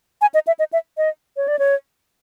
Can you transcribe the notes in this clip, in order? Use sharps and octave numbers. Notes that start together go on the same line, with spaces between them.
G#5
D#5
E5
D#5
E5
D#5
C#5
D5
C#5